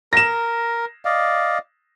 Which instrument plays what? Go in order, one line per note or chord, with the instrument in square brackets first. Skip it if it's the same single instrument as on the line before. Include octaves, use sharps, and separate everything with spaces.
[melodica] A#4 [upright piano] A#6 E7
[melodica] D5 D#5 F5